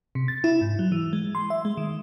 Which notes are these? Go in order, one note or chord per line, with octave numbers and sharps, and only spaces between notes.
C3
A6
E4
G#2
F#3
E3
G#3
C6
E5
G#3
D#3